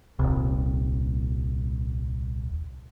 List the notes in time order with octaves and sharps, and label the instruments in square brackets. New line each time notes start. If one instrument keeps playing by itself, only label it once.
[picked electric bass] D#1 C2